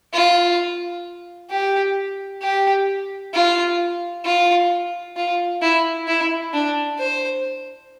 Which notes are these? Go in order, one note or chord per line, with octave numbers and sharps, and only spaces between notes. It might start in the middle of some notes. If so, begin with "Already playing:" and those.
F4
G4
G4
F4
F4
F4
E4
E4
D4
C5